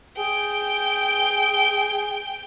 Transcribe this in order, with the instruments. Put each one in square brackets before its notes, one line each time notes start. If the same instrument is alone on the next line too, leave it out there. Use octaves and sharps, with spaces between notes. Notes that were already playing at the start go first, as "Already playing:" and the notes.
[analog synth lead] G#4 [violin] G5